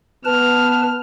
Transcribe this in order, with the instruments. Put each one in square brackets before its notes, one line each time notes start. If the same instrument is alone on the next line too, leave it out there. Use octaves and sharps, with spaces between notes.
[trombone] B3 [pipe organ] B4 A5 [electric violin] F6